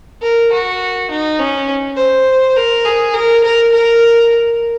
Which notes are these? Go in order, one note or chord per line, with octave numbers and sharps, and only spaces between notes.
A#4
F#4
D#4
C#4
C5
A#4
G#4
A#4
A#4
A#4